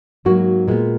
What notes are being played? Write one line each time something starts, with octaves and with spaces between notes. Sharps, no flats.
G#2 F#3 A#3 F#4
A#2 G#3 B3